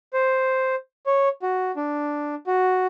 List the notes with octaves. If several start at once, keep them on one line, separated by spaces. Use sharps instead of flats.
C5
C#5
F#4
D4
F#4